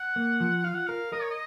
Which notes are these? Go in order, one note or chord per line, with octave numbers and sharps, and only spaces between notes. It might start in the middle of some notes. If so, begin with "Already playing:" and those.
Already playing: F#5
A#3
F3
F4 F5
F#5
A#4 F5
A#4 D#5
C#5
D#5